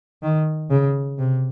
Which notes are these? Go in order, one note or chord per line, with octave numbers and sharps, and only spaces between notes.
D#3
C#3
C3